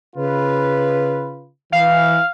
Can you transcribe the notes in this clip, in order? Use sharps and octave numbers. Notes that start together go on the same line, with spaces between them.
C#3 F4 B4
E3 F5